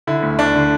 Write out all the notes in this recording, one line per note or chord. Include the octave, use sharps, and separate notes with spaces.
D3 E4
D2
D2 D4
D3